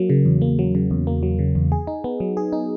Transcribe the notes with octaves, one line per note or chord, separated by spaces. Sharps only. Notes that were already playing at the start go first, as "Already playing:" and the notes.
Already playing: F#3 A#3
C#3
E2
A#3
F#3
C#3
E2
A#3
F#3
C#3
E2
G#4
D#4
B3
F#3
G#4
D#4